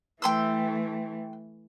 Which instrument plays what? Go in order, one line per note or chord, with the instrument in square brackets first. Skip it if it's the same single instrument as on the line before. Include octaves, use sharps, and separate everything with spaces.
[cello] E3 A3 [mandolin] G5 C6 E6